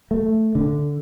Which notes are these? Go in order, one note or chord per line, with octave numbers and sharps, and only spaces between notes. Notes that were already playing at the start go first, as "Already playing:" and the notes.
A3
D3